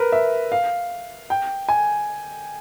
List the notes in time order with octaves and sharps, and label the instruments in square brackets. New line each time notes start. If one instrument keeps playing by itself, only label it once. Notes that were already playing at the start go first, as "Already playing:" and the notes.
Already playing: [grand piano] A#4 B4
E5
F5
G5
G#5